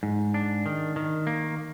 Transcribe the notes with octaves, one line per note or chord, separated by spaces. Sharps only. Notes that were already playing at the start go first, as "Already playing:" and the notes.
G#2
D4
D#3
D#3
A#3